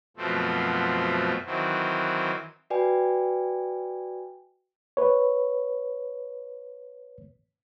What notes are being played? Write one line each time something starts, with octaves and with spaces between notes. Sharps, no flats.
F#2 B2 F3 A3 C4
D#3 E3 F#3 C4
F#4 B4 D5 G5 G#5
B4 C#5